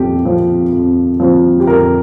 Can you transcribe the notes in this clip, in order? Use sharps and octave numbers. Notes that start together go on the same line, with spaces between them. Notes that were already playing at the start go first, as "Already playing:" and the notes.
Already playing: F2 F3 C4 G4
F3 C4
F2
F3 C4
G4
F2 A#4